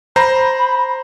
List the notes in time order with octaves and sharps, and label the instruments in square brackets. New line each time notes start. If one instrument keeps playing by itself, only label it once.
[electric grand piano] C5 A#5 [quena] B5